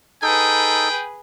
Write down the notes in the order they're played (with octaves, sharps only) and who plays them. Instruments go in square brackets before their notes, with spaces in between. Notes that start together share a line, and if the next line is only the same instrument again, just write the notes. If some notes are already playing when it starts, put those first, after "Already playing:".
[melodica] D#4 A4 [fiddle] G#4 B4 [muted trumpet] G5